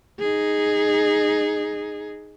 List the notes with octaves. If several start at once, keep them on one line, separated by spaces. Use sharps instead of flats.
D#4 G#4